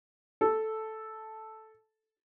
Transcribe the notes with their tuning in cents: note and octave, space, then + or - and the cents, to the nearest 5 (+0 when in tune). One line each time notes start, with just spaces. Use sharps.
A4 -5